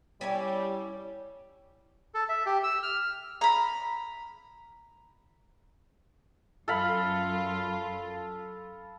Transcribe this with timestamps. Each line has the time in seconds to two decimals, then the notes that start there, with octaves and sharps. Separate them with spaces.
0.21 G3 C#4 E4 G#5
2.14 A4
2.29 E5
2.46 G4
2.64 E6
2.83 F6
3.41 A#5 B5
6.68 F#2 F4 A4 F5 B5